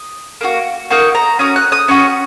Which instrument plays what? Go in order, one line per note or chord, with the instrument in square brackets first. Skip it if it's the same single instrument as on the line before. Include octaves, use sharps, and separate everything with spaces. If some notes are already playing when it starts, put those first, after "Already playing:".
Already playing: [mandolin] D#6
A#3 D#4 F#4
A#3 D#4 F#4 C#6
A#5
C#4 F#4 D#6
F#6
D#6
C#4 F#4 C#6